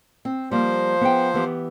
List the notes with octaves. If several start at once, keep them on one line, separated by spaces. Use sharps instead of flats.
C4
F3 G3 A#3 C5
B3 G#4 G5
E3 B3 G4